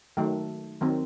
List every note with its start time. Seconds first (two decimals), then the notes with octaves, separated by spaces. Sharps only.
0.17 D#3 F#3 A3
0.81 D#3 F#3 C4